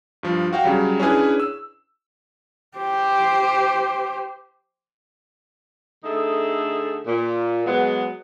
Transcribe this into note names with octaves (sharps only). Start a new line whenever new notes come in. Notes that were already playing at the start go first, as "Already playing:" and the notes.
G2 F3
F#4 F5 G5
C#3 F#3 G3
C#4 D4 E4 G#4 B4
E6
G4 C5
D3 A3 D#4 G#4 A4 E5
A#2
F#3 G#3 B3